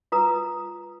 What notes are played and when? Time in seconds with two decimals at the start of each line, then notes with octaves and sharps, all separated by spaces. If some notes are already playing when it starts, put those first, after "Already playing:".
0.12 F4 B4 A#5 D#6